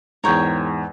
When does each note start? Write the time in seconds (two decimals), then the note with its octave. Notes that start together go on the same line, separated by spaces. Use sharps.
0.24 E2 G#2 A#4 C#5 G5